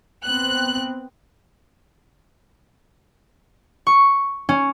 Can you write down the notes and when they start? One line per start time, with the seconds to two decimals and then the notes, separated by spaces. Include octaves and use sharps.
0.24 B3 C4 F#6
3.87 C#6
4.49 C#4